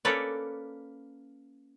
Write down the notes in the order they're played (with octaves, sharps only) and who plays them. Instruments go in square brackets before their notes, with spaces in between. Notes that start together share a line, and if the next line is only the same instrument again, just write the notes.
[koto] A#3 C#4 A4 B4 C#5 D5